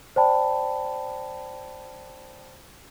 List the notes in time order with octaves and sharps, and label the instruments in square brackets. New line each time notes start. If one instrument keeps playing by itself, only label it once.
[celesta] C5 D5 G5 A5 B5